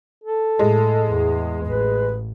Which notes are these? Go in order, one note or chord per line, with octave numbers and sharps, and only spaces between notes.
A4
A2 G#3
E2
A1 B4